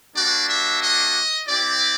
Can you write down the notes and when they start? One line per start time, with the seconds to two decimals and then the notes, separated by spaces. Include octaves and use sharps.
0.14 G3 A#3 D4 F#4 D5
0.47 E5
0.81 D#5
1.47 C4 E4 G4 D5